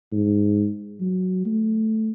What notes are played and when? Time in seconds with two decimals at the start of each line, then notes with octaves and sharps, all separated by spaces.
0.12 G#2
1.00 F#3
1.46 A3